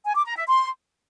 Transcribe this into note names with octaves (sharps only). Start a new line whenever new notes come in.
G#5
D6
A#5
E5
C6